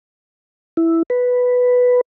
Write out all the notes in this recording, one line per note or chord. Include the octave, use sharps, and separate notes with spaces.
E4
B4